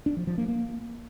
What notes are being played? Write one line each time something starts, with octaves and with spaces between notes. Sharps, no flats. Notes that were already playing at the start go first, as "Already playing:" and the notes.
D4
F3
F3
A#3
A#3